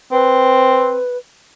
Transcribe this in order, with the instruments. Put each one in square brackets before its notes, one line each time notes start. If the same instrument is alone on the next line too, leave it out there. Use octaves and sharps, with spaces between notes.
[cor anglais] C4 [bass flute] B4